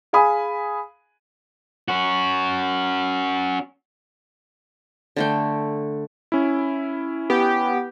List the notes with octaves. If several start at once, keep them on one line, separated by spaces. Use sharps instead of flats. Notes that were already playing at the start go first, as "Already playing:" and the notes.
G#4 F5 G#5 B5 D#6
C#4 F#4
D3 A3 G5
C#4 E4
B3 G4